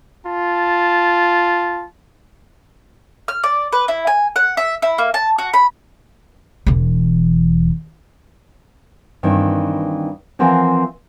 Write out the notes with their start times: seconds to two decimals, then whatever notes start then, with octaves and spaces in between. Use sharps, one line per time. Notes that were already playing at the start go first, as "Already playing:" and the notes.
0.25 F4 A5
3.28 F6
3.44 D5
3.73 B4
3.88 E4
4.07 G#5
4.36 F#5
4.57 E5
4.82 E4
4.98 A#3
5.14 A5
5.38 F#4
5.54 B5
6.67 E1 E3
9.23 G2 D#3 E3 C4
10.39 E3 F3 C4 A#4 F#5 G#5